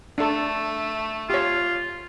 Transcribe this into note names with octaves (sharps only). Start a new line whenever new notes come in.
A3 D4 A4
F4 G4 C#5